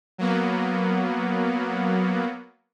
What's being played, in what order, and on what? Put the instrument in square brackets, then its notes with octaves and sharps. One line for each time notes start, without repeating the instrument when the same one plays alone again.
[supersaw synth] F#3 A#3 B3